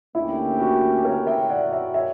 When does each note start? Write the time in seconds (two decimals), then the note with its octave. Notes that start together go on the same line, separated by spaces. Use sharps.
0.15 D2 D3 A#3 C#4 E4 G4
0.60 F#4
1.05 A#4 C#5
1.27 E5 G5
1.50 D5 F#5
1.72 C#5 E5
1.94 C#5 E5